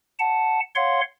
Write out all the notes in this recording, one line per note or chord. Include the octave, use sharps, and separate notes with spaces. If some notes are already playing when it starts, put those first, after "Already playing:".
F#5 A5
C#5 F5 F#5 C6